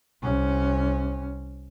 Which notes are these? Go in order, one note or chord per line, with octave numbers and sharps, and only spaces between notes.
C2 C#4